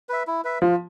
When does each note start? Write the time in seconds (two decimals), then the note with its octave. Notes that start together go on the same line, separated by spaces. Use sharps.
0.09 B4 E5
0.27 E4
0.44 B4 E5
0.62 F3 F4